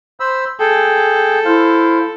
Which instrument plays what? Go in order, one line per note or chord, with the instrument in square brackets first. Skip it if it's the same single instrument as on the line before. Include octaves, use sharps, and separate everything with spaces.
[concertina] C5 B5 E6
[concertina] G#4 G5 [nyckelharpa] A4
[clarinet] E4 [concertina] C5 F5